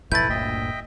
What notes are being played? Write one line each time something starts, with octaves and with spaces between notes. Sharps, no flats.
B1 F2 A2 A3 E4 B4 G6 A6
G1 D2 A#2 D#5 E5 G5